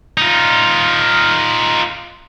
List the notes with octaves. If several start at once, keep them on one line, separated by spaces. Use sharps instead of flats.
D#4 F4